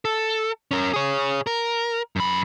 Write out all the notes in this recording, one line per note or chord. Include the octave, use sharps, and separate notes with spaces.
A4
C#4 A#4
G#4 C#5
A#4
F#2 B5